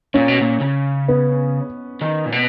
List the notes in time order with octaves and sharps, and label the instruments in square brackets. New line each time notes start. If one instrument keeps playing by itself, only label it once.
[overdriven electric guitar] A#2 [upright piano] C#4
[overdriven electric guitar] B2
A#2
C#3
[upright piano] B3
[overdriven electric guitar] D#3
A#2
B2